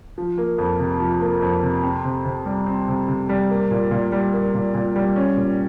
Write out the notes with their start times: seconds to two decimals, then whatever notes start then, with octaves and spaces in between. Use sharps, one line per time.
0.18 F3
0.38 A#3
0.58 F2
0.79 C3
1.00 F3
1.21 A#3
1.42 F2
1.63 C3
1.83 C4
2.05 C3
2.25 C3
2.46 G3
2.66 C4
2.88 C3
3.08 C3
3.29 G3
3.50 A#3
3.71 A#2
3.91 A#2
4.12 G3
4.33 A#3
4.54 A#2
4.74 A#2
4.96 G3
5.16 C#4
5.37 A#2